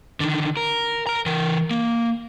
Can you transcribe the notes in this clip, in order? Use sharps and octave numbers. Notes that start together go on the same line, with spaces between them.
D3 D#3
A#4
A#4 A#5
E3 A#4
A#3